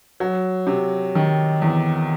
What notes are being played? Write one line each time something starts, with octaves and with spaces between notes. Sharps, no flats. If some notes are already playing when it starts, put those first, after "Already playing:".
F#3
C3
D#3
E2